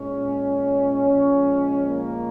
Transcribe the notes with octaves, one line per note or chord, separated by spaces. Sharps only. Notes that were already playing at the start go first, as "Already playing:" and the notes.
Already playing: A#2 G#3 C#4
A#2 F3 G#3
A#3